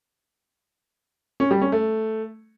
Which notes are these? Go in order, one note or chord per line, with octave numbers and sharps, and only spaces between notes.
C#4
G3
C#4
A3